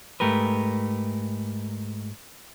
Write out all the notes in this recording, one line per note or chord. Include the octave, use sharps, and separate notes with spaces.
G#2 A3 G4 A#4 B4